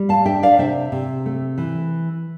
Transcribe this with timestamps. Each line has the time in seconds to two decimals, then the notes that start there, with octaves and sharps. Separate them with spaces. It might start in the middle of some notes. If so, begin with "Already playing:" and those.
Already playing: G3
0.09 F5 A5
0.25 D4 E5 G5
0.43 D5 F5
0.58 C3 C5 E5
0.92 C3
1.26 A3
1.58 E3